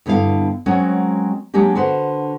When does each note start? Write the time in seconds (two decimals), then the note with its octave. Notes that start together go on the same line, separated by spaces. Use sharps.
0.06 G2 D3 B3 E4 F5
0.66 F#3 G#3 C4 C#4 F#4 A#4
1.54 F#3 G#3 A#3 D4 G4
1.75 D3 F#4 B4 C5